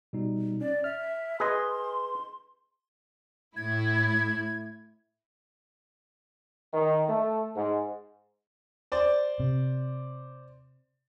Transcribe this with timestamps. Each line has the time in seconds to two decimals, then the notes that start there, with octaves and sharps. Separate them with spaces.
0.13 B2 G3 D#4
0.61 C#4 D5
0.84 E5 F6
1.40 G#4 B4 D#5 C6
3.56 A2 E4 G#6
6.74 D#3
7.09 A3
7.56 G#2
8.92 C5 D5
9.40 C3